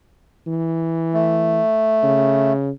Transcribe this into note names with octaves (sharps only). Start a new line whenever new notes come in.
E3
A3
C#3